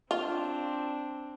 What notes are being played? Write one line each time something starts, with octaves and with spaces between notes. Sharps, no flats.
C4 D4 F4